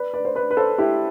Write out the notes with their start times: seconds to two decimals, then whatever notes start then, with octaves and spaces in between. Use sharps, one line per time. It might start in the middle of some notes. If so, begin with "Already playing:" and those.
Already playing: B4 D5
0.14 B4 D5
0.25 C5
0.35 B4 D5
0.51 B4
0.57 A4 C5
0.78 E4 G4